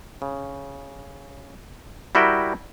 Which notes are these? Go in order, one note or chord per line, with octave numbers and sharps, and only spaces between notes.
C#3
G3 E4 F#4 A#4 E5 G5